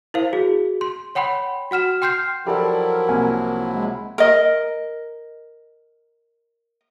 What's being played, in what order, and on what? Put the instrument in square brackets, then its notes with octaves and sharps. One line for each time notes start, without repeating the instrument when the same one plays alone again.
[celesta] E4 A#4 C5 F5
F#4 G#4
C6
C#5 F#5 G5 B5 C6
F#4 F#5 F6 E7
G5 C6 F6 G6 C7
[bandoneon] F3 F#3 E4 [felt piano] G4 A4 D5 [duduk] A#4
[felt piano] C2 A#3 G#5
[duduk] G#3
[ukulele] A#4 D#5